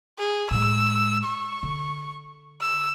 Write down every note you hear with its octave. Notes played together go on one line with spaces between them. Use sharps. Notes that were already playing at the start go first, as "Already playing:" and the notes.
G#4
A2 G#3 E6
C#6
D3
E6